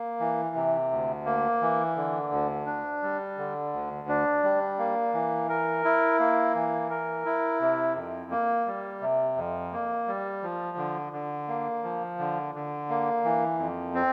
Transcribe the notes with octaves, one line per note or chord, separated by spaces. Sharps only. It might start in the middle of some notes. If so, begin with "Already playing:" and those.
Already playing: A#3
E3
C3
D2
A#3
E3
D3
D2
D4
G3
D3
D2
D4
G3
A#3
E3
A#4
E4
A#3
E3
A#4
E4
C3
F2
A#3
G3
C3
F2
A#3
G3
F3
D3
D3
A#3
F3
D3
D3
A#3
E3
F2
C4